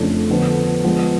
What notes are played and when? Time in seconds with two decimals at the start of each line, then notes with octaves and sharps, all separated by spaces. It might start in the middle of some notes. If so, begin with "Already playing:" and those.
Already playing: F2 C#3 F3 A3 D4
0.30 D3 F3 B3 D4
0.84 F3 G#3 B3